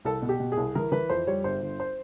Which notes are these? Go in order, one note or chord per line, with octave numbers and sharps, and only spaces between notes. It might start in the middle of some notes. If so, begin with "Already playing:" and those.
C2 A4
B2
G4
B2
G#4
C2
E3 A#4
E3 B4
F2 C5
G3 C#5
G1 C5
G1
C5